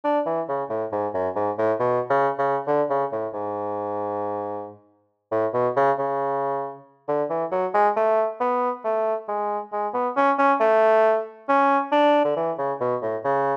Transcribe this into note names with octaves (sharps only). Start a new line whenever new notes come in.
D4
E3
C#3
A2
G#2
F#2
G#2
A2
B2
C#3
C#3
D3
C#3
A2
G#2
A2
B2
C#3
C#3
D3
E3
F#3
G#3
A3
B3
A3
G#3
G#3
B3
C#4
C#4
A3
C#4
D4
D3
E3
C#3
B2
A2
C#3